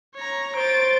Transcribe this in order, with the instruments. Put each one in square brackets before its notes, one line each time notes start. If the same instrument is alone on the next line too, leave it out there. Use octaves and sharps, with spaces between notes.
[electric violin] C#5 A#5
[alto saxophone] C5 [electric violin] A6 D7